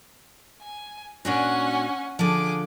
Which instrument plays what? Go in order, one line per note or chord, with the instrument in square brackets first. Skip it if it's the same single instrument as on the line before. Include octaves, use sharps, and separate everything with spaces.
[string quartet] G#5
[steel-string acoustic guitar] A#2 D4 F#4 [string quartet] C#4 F#5 G#5
[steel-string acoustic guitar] D3 F3 [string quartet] G#4 D6